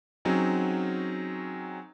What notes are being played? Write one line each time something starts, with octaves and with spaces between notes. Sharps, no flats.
F#3 C4 C#4 D#4 G#4